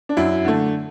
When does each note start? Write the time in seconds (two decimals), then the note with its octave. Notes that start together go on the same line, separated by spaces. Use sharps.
0.09 D4
0.17 F#2 E4
0.45 D3 A3